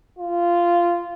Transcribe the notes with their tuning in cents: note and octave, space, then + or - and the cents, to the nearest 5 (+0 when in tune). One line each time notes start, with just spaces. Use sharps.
F4 -15